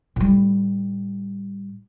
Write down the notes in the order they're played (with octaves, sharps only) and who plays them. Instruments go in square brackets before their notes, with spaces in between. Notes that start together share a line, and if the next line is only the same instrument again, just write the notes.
[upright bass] A2 G3